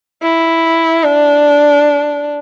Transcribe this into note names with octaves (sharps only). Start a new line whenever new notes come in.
E4
D4